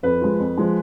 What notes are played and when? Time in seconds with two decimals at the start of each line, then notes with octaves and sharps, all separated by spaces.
0.03 F2 B4
0.21 F3 G#3
0.39 F2
0.58 F3 G#3